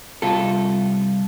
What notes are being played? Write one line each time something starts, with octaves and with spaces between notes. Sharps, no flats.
C2 F4 A4